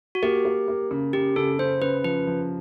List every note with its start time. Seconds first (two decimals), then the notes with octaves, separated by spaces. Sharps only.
0.15 F#4
0.23 A#3 G4
0.45 A#3
0.68 A#3
0.91 C#3
1.13 C#3 G4
1.36 C#3 A4
1.59 C#3 C5
1.81 C#3 B4
2.04 F3 B4
2.27 F3